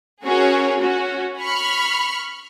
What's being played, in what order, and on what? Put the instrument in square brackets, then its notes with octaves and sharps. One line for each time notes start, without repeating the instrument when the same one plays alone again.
[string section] C#4 F#4 G#4 A#4 C#5
C#4 F#4
B5 C#6 F6